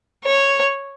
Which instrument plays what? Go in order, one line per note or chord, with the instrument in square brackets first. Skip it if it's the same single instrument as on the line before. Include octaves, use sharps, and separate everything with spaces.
[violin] C#5